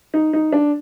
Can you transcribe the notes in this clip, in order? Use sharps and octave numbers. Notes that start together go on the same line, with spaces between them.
D#4
D#4
D4